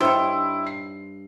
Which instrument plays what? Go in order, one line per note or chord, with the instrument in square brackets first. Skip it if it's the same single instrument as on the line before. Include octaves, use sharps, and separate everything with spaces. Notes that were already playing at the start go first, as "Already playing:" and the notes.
[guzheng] G2 C#5 [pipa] D#4 C5 [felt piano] E4
[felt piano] C7